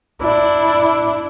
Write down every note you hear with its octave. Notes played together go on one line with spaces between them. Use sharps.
D4 E4